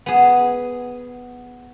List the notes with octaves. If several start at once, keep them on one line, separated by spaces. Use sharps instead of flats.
B3 G#4